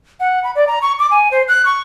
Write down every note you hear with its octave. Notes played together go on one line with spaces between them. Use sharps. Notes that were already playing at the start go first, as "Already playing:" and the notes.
F#5
B5
D5
A#5
C#6
D6
G#5
C5
F#6
C#6